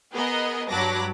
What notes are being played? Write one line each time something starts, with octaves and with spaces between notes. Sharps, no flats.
B3 G#4 A#4 D#5
G2 F#3 A5 B5 D6 A#6